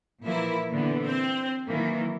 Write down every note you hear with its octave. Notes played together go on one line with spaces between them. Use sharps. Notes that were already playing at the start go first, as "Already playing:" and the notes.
A#2 E3 F3 A#3 E4
A#2 D3 E3 B3
C4 C5
D#3 E3 F#3 A#3